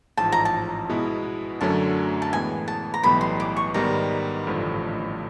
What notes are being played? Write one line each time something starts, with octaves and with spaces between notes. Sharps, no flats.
A1 G#2 F3 A5
A#5
A5
B2 G#3 B3 E4
F#2 D3 F#3 A3 C#4 A5
A5
A2 E3 G#3 B3 G#5
A5
A#5
B1 A2 E3 G3 B3 B5
C6
D6
C#6
G#2 D#3 G3 B3 A#5
A1 G2 D3 F3 A3